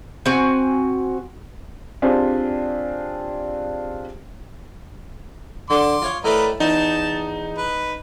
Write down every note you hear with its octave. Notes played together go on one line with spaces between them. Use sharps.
C4 F#4 G#5
C4 D4 F4 G4 G#4 C5
D3 C6 D6
F4 C#5 F5
A2 A3 A#4 B4 D5 D#5
E2 D#4 A5
B4